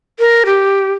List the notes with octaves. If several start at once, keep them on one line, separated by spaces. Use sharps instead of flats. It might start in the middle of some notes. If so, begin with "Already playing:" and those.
A#4
G4